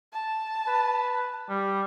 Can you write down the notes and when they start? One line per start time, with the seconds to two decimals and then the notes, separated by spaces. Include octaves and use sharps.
0.13 A5
0.67 B4
1.50 G3